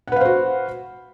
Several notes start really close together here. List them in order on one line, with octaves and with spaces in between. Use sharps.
F#5 B4 F5 C5 F#4